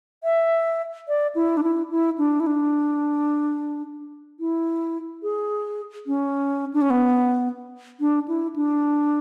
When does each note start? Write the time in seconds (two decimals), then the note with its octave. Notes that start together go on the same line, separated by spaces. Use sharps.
0.24 E5
1.08 D5
1.35 E4
1.57 D4
1.63 E4
1.91 E4
2.18 D4
2.40 E4
2.47 D4
4.40 E4
5.23 G#4
6.07 C#4
6.74 D4
6.81 C#4
6.90 B3
8.00 D4
8.28 E4
8.56 D4